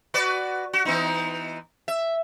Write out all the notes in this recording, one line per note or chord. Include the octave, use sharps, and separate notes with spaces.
F#4 B4 D5
F#4
E3 B3 D#4
E5